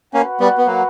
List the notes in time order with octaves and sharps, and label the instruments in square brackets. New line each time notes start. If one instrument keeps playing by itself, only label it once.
[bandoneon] A#3 C#4 [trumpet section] F#4 B4 F#5
[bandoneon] G3 B3
B3
F#3 A#3